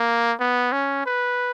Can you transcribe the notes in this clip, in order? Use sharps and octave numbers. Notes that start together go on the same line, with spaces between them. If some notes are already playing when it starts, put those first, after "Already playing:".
Already playing: A#3
B3
C#4
B4